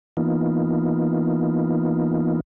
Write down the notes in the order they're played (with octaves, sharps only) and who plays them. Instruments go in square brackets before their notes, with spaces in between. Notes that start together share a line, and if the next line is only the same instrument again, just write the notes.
[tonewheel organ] E3 A#3 B3 D#4 F4